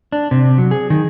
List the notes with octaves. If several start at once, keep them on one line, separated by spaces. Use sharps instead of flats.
D4
C3
F#3
G#4
D#3